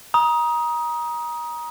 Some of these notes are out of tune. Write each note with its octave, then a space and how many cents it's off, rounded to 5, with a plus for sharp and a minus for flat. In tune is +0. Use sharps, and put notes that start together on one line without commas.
A#5 +30 D#6 +10